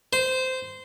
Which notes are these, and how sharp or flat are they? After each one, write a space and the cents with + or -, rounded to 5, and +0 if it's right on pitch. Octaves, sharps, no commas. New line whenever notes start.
C5 -15